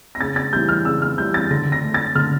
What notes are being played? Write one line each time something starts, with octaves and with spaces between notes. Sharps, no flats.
A#6
C#3 A6
A6
E3 G3 G6
F6
C#3 E6
F6
E3 G3 G6
A6
D3 A#6
A#6
A3
A6
D3 F6